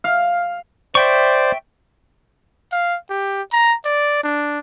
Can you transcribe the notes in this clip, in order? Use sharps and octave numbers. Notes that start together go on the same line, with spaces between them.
F5
C5 D5 E5 G5 C#6
F5
G4
A#5
D5
D4